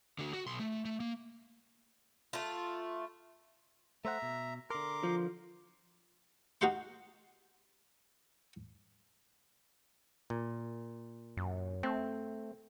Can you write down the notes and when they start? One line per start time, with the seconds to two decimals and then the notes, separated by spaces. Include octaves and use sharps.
0.19 D3 F#4
0.33 F#4
0.46 B1 C6
0.59 A3
0.85 A3
1.00 A#3
2.33 A3 F4
4.05 A3 C5 E5 F#5 A#5
4.22 B2
4.70 D3 A#4 A#5 C6 D6
5.03 F3
6.61 D#4 F#4 G4 F5 F#5 C6
10.30 A#2
11.37 F#2
11.83 A3 C4